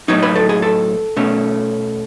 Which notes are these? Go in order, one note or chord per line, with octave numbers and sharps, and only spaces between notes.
A2 F#3 B3 D#4 C#5
B4
A4
G#4
A4
B2 A3 C#4